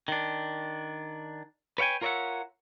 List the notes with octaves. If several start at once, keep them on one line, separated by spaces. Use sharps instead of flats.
D#3 D4
B4 C#5 F5 G5 G#5
F4 A#4 C#5 D5 E5 F#5